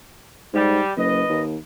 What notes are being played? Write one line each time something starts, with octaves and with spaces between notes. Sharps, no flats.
G#2 G3
F#1 B4 D#5
D#2